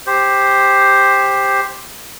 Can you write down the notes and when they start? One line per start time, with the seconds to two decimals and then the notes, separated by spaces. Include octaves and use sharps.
0.06 G4 C5